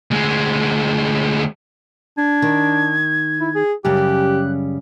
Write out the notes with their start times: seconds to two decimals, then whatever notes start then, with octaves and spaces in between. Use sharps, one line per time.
0.11 D2 G#3
2.18 D4 G#6
2.42 D#3
3.40 E4
3.55 G#4
3.85 F#2 C#3 G3 G4 F#6